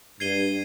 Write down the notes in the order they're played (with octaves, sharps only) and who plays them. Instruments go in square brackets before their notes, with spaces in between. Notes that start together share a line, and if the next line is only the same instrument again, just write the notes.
[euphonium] G2 [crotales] G#6 C7 D#7 G7